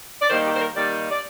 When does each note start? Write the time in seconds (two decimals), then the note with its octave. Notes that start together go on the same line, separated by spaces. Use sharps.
0.22 D5
0.30 D#3 G3 A#3 D#4 C5
0.45 G4
0.55 C5
0.60 A#4
0.75 D#3 G3 A#3 D#4 D5
1.11 D5